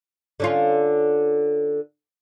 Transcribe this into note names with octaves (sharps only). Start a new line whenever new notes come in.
D3 C#4 F4